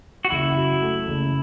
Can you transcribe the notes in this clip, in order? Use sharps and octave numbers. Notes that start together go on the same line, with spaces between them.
F#4
F#1 E4
F#3
A3
F#1